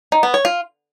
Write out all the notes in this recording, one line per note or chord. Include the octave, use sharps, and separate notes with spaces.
D#4
B3
C#5
F4